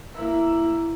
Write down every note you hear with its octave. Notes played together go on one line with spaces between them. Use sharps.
A#3 E4